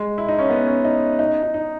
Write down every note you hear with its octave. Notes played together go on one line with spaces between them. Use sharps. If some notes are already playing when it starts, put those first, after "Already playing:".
Already playing: G#3
E4
D#4
C#4
B3
C#4
D#4
D#4
D#4
D#4